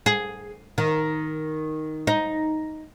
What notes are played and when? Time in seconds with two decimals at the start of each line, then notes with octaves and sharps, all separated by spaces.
0.06 G#4
0.78 D#3
2.07 D#4